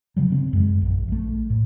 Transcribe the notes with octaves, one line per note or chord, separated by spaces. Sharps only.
C#3 F#3 G3
C#3 B3 C4
F#2 G#3
A#1
A#1 A3
A2